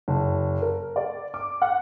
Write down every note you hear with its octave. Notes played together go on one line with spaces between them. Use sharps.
F#1
A#4
D5
D6
F#5